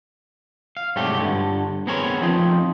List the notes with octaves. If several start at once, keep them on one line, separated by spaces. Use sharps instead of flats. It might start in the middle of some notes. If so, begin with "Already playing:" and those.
F5
G#2 C3 F#3 G3 A3 G4
G2 D3
B3 C4 G#4 A#4 C5 C#5
F3 C4 D#4